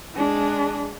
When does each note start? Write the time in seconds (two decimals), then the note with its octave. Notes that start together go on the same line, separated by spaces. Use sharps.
0.15 G#3 D4